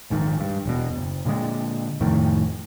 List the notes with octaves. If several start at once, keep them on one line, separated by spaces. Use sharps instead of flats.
A#1 G#2 D#3
G2
E1 B2
F#1
A#2 D3 G3 G#3
F1 F2 A2 D#3